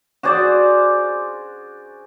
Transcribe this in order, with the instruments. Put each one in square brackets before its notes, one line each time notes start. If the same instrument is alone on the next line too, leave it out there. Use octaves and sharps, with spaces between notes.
[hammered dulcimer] F#4 G#4 C5 D5